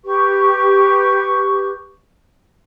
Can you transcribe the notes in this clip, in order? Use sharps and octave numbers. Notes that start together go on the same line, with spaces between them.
G4 B4 C#6